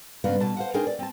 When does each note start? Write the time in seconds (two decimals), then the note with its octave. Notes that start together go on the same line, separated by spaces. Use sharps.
0.24 G2 C#3 A#3 B3 F5
0.40 B2 A5
0.57 C5 F5 F#5
0.74 C4 D4 D#4 G#4 A#4 C5
0.87 D5
0.99 C4 A5